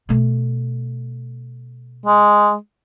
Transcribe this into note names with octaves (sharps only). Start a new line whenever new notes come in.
B2 A3
G#3